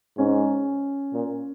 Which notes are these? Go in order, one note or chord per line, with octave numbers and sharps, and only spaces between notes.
G#2 C#4
A#2